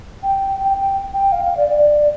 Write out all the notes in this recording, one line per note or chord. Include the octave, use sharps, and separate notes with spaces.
G5
G5
G5
G5
F5
F5
D5
D5